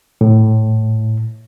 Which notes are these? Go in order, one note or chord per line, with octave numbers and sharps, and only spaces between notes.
A2